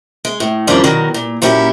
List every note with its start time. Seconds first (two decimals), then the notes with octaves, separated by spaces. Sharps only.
0.25 G#3
0.40 A2
0.67 F2 D#3 G3 C#4 D4
0.84 B2 D#3 F#3
1.14 A#2
1.42 A#2 F#3 C#4 E4 G4